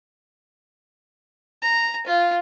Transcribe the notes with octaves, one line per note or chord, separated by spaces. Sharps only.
A#5
F4